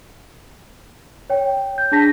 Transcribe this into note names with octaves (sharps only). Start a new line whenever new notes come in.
C#5 G5
G6
D4 G#4 A5 A#6 B6